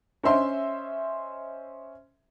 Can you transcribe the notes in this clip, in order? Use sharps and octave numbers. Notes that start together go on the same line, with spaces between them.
C#4 C5 D#5 E5 C6